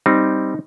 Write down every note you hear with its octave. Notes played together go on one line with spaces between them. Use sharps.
G3 C4 D#4